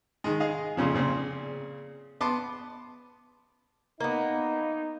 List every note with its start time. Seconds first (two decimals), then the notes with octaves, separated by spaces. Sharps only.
0.24 D#3 G#3
0.40 G#4 D#5 F5
0.77 F2 A#2 C#3 F3
0.94 A#2 C#3 C4
2.21 B3 A5 C6 D6
4.00 A#3 B3 D#4